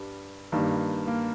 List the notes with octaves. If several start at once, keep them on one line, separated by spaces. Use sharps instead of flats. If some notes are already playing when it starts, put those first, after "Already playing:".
Already playing: G2 G3
G2 D#3 G3 A#3
A#3